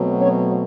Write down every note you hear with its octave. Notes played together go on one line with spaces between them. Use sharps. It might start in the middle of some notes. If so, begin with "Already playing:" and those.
Already playing: B2 F#3 A3 C4
C#4 C#5